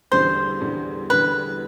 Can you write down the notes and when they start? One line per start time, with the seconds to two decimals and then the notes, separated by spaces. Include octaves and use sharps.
0.12 E2 D3 G3 C5
0.61 E2 D3 G3
1.09 E2 D3 G3 B4